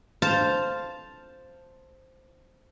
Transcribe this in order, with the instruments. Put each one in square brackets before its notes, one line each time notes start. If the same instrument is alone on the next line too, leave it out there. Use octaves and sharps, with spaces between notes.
[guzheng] C5 F5 A5